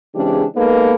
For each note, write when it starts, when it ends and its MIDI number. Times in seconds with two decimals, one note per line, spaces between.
0.15 0.44 49
0.15 0.44 52
0.15 0.44 56
0.15 0.44 60
0.15 0.44 62
0.15 0.44 67
0.56 0.94 56
0.56 0.94 58
0.56 0.94 59
0.56 0.94 63
0.56 0.94 69
0.56 0.94 71